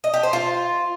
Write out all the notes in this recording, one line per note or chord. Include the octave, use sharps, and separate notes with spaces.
D#5
G4
C5
F4